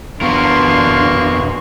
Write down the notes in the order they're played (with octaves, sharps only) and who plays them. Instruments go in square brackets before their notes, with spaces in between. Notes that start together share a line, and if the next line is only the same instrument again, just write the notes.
[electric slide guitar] F2 B3 [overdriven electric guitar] B2 A#4 [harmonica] A#3 C#6 [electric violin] D4 C6